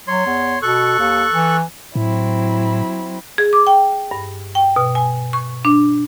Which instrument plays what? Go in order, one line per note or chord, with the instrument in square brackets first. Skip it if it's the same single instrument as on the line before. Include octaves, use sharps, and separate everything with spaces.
[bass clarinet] F#3 [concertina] C#5 C6
[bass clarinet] E2
[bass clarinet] B2 [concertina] A4 C#6 F#6
[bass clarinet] D#2
E3
[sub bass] A2 [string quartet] F#3 C4 E4
[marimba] G#4
D6
G5
G2
G5
B2
G#5
C#6
D4